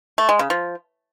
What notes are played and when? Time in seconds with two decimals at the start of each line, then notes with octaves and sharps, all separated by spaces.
0.18 A3
0.29 G#3
0.39 C#3
0.50 F3